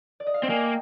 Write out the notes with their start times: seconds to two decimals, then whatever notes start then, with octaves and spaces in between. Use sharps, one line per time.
0.20 D5
0.26 D#5
0.34 F5
0.42 C4 G5
0.50 A#3 G#5
0.63 G5